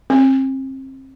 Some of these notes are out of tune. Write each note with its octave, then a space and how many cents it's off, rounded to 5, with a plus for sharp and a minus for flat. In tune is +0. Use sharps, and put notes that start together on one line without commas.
C4 +30